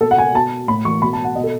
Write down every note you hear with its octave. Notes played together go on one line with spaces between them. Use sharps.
B2 A4
F#5
G#5
B2 A5
A2 B5
E3 C#6
B2 B5
A5
F#5
B2 D#5
A4